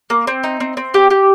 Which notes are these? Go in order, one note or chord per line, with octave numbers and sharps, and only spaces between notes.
A#3
C4
D#4
C4
C4
G4
G4